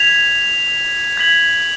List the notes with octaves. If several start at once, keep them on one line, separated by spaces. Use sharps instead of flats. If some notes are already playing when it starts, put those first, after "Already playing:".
Already playing: G#6 B6 F7
G#6 B6 F#7